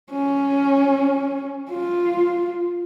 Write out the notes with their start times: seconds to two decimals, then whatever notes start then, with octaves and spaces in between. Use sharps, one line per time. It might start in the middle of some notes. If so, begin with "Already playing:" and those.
0.13 C#4
1.70 F4